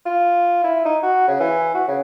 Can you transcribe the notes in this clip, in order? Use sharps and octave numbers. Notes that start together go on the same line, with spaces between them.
F4
E4
D#4
F#4
C#3
E3
F#4
C#3